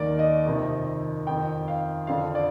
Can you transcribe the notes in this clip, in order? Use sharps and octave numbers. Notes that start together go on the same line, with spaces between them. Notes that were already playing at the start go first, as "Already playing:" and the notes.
Already playing: D#2 D#3 A#4 D5
D#5
F2 C3 D#3
F2 D#3 G5
F5
F2 D3 F5
D5